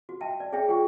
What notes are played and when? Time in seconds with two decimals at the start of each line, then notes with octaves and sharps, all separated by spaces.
0.09 F#4
0.21 D#5 E5 G5 A5
0.40 D5
0.53 G#4 C#5 E5 G5
0.68 F4 G#4 F#5 G5 C#6